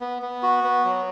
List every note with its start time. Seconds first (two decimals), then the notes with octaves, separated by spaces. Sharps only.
0.01 B3
0.22 B3
0.43 F#4
0.64 B3
0.85 F#3